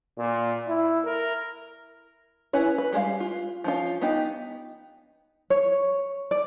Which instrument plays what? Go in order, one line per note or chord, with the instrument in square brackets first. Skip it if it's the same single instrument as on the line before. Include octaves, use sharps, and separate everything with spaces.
[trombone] A#2
E4
A#4
[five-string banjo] C#4 E4 B4 C#5
B4
G3 G#3 C5 F5
F4
F3 C#4 F4
B3 D#4 G4
[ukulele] C#5
D5